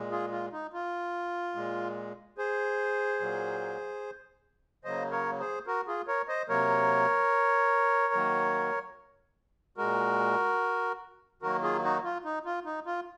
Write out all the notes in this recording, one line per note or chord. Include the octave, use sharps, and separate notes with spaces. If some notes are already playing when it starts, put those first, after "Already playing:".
Already playing: A#2 G#3
F4 G#4
F4
D#4
F4
A#2 G#3
G#4 C5
A#2 F#3 A#3
C#3 F#3 A#3 C5 D#5
A#4 C#5
G#4 C5
F#4 A#4
F4 G#4
A#4 C#5
C5 D#5
C3 F#3 A#3 A#4 C#5
D#3 F#3 A#3
A#2 G#3 F#4 A#4
D#3 F#3 A#3 F#4 A#4
F4 G#4
D#4 F#4
F4
D#4
F4
D#4
F4